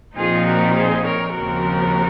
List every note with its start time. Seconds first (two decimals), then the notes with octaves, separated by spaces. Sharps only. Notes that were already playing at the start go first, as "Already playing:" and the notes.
0.16 A#2 F3 C4 D#4 F4 G#4
0.45 F#4 A#4
0.75 G#4 C5
1.04 A#4 C#5
1.34 D#2 C#3 F3 C4 F#4 A#4